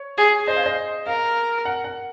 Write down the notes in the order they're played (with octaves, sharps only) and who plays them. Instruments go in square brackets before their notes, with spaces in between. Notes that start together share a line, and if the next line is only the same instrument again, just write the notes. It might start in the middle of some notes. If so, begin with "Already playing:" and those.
Already playing: [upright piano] C#5
[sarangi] G#4
[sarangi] C5 [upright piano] D#5
[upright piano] F5
D#5
[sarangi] A#4 [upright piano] F5
[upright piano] F#5
F#5